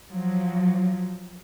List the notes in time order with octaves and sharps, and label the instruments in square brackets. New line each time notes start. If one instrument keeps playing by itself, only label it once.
[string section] F3 F#3